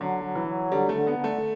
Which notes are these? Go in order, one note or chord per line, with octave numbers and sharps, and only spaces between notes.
D3 F#3
F#3
E3
F#3
D3 G3
A3
D3
B3
D3
A3